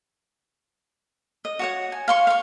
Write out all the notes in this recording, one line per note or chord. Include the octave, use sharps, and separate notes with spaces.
D#5
F#4 C#5 F#5
G#5
F5 C6 C#6
F5 C#6